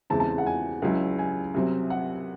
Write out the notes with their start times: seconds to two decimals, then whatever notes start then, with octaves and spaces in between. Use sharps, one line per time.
0.10 E2 C#3 E3 G#3 C4 A5
0.20 A5
0.38 F#5
0.46 G#5
0.82 C#2 C#3 F#3 C#4 E4
1.19 G#5
1.54 C2 C3 F#3 C4
1.90 F#5